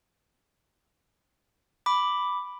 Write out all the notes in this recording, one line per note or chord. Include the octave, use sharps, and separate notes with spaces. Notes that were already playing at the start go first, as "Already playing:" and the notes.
B5 D6